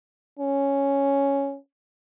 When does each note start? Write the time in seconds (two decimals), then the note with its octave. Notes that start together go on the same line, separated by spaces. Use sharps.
0.39 C#4